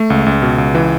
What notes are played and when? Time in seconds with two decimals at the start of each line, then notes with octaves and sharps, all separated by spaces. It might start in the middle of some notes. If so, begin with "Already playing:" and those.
Already playing: A3
0.10 C#2
0.26 C#2
0.42 B2
0.58 C#2
0.75 E3